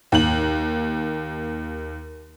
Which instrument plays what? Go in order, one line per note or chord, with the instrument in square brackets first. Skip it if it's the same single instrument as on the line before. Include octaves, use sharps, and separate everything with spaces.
[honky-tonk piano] D#2 F#7